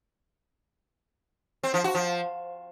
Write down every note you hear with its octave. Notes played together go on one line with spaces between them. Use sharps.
C4
F3
F#4
F3